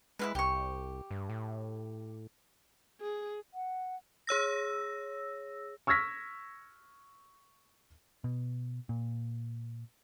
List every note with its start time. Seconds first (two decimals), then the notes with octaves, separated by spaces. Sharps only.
0.19 G#3 E4 F4 B4
0.35 C2 G4 C#6
1.11 G2
1.29 A2
3.00 G#4
3.54 F#5
4.27 G#4 C#5 E6 A#6
5.87 C#6 E6 F6 G#6 A#6 B6
8.24 B2
8.89 A#2